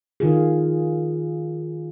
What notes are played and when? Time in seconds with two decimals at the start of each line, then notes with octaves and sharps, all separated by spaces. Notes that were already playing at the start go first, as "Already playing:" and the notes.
0.20 D#3 F4 G#4